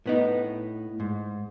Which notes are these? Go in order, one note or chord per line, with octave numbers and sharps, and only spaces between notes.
A2 B3 D#4
G#2